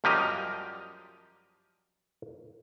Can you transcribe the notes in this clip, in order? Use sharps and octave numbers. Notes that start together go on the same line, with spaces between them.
F#2 F3 G3 G4 D#5 A#5